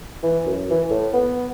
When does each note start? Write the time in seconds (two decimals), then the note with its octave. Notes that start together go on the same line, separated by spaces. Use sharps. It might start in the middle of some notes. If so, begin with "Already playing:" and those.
0.23 E3
0.46 F#2
0.70 E3
0.90 A2
1.13 B3